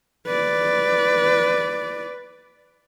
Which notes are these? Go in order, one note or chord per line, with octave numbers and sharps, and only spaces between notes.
B4 D5